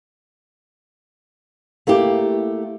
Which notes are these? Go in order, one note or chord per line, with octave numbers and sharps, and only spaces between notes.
A3 A#3 E4 G4